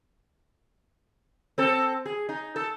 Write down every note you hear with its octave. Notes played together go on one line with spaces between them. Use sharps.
C4 A4
G#4
D#4
A4